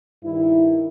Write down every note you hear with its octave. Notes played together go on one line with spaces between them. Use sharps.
G2 D#3 E4